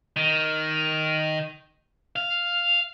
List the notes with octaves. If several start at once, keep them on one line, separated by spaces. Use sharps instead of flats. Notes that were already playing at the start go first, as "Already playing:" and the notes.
D#3
F5